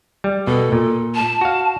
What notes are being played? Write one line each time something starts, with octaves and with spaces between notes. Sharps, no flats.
G3
B2 A4
A#2
A5
F#4 F5